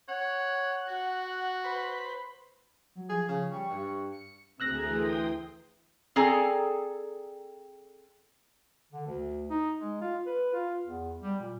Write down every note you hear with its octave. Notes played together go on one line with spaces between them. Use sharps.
C#5 F#5
F#4
B4 C5 B5
F#3
F3 G#4
C#3
G3 C#6
G2
C#7
D2 A3 C4 G#4 A#5 E6 F#6 A#6
E3 G5 C6 D#6
C4 G#4 A4 D5 G#5 A#5
D3
D2
D#4
G#3
F4
B4
F4
E2
G3
A#2